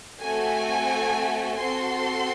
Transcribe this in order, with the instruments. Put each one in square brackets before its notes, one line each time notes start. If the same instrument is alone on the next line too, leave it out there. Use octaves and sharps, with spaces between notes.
[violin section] A3 C4 F#4 A4 G#5
C4 F#4 A4 C6